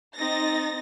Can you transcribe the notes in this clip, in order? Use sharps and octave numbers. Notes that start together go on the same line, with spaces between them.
C4 D#4 A6 A#6